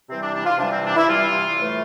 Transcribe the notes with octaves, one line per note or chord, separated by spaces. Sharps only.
C3 E3 G3 C4
D4
D4
F4
C3 E3 G3 D4
C4
D4
E4
C3 E3 G3 F4
A2 E3 A3